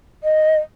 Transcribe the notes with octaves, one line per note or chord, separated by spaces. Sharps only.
D#5